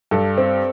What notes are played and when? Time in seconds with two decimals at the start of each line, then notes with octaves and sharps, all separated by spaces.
0.11 G2 A4
0.38 C4